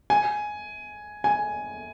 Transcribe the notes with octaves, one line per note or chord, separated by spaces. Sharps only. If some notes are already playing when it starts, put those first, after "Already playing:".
G#5
G#5